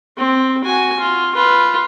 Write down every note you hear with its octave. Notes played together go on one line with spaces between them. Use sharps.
C4
F#4 G#5
F4
F4 B4